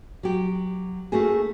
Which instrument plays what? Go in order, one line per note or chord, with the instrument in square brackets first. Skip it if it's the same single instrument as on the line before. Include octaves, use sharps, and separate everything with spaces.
[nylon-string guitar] F#3 G4
A3 A#3 C#4 D#4 F#4 G#4